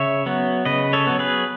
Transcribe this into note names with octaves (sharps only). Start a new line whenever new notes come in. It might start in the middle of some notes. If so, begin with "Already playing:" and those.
Already playing: C#3 C#5 E5
F#3 B3
C#3 B4 D#5
A4 C#5
F#3 B3
G#4 B4